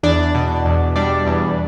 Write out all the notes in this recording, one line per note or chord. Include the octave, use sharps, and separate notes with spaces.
E2 D4 D5
B2
E2
G3 D4 D5
E2